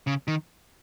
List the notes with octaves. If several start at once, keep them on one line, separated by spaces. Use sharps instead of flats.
C#3
D#3